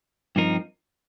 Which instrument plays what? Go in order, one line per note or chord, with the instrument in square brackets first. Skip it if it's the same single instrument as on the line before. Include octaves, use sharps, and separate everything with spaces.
[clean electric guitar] G2 F3 C4 D#4 A#4